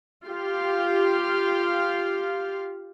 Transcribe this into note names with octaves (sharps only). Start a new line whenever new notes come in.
F4 G4 F5